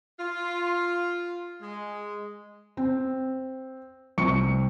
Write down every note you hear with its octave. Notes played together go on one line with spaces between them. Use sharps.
F4
G#3
C4
C2 C4 C#6 C#7